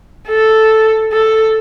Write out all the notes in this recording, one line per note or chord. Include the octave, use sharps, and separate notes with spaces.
A4
A4